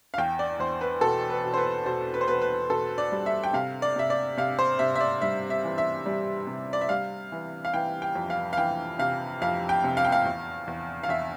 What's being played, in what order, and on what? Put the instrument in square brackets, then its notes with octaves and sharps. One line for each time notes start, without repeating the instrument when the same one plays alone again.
[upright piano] F5
E2 G5
D5
E2 C5
B4
B2 A4
B4
B2
C5
B4
B2 C5
B4
C5
B2 B4
B4
B2 A4
D5
G3
E5
G5
C3 F5
D5
C3 E5
D5
C3 F5
C5
C3 E5
E5
D5
G3 E5
E5
E3
E5
G3
C3
D5
E5
G3 F5
E3
F5
E3 G5
G5
F2
F5
F5
E3 G5
C3 F5
F2 F5
G5
C3
F5
G5
F5
E2
E2
F5
E2 E5